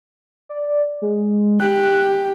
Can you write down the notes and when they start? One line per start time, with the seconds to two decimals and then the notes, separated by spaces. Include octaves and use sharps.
0.49 D5
1.02 G#3
1.60 G4 F#6